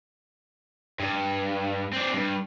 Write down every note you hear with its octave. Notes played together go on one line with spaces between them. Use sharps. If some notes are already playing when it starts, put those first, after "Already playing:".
G2
C4 D4
G2